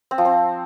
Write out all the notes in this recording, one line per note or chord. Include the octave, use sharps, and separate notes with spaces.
C4
F3
C4